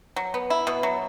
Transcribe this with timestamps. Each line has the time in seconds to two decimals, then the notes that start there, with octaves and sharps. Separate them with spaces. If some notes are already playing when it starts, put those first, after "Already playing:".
0.16 F#3
0.34 B3
0.50 E4
0.67 B2
0.83 F#3